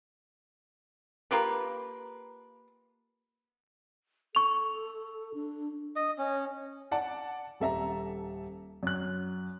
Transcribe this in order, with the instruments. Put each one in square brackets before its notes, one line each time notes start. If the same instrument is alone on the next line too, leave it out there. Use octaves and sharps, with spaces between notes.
[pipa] A#3 F4 G4 B4
[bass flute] A4 [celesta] C#6 F7
[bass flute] D4
[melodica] D#5
C#4
[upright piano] D5 F#5 A5
D#1 A4 E5 A#5
F#2 F#6